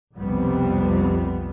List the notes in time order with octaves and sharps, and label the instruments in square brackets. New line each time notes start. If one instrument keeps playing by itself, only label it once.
[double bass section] B1 F2 C3 G3 B3 C4